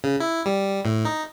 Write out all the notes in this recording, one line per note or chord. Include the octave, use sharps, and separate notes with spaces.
C#3
E4
G3
A2
D#4